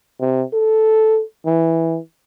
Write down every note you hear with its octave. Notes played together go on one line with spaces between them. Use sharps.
C3
A4
E3